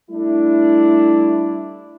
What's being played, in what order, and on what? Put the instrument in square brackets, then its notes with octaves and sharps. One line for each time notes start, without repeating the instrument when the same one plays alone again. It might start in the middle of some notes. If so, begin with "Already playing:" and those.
[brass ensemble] G3 A3 D4 E4